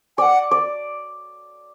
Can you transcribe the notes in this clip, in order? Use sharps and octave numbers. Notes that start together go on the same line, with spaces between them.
D5 F#5 G#5
D5